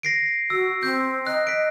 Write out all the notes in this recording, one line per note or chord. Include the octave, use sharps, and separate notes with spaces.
A#6 C7 D7
F#4 E6
C4 G6
D#5 F#6
B6 D7